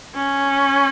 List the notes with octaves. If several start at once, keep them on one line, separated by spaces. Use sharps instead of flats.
C#4